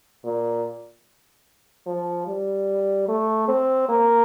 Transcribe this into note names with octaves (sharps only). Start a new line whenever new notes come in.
A#2
F3
G3
A3
C4
A#3